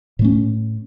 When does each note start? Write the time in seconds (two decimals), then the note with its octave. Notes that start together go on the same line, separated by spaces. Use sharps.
0.19 A2
0.22 A3
0.24 C#4